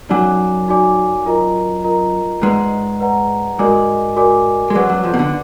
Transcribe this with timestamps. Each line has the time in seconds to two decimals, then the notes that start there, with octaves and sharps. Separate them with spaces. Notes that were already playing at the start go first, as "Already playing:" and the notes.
0.09 F#2 F#3 D#4 F#4 D5 G#5 D6
0.68 D#4 F#4 D5 G#5 D6
1.26 F4 A#4 D#5 A#5
1.84 F4 A#4 D#5 A#5
2.42 G#2 G#3 B4 D5 F#5 A#5
3.00 B4 D5 F#5 A#5
3.59 G#2 G#3 F#4 A#4 D5 G#5 D6
4.17 F#4 A#4 D5 G#5 D6
4.70 G#3
4.75 F#2 F#3 B4 D5 F#5 D6
4.89 F#2 F#3
5.04 F2 F3
5.14 B2
5.19 D3